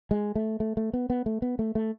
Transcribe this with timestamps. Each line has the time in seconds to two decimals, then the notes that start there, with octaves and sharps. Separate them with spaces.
0.11 G#3
0.35 A3
0.60 A3
0.77 A3
0.93 B3
1.10 B3
1.26 A3
1.42 B3
1.59 A3
1.75 A3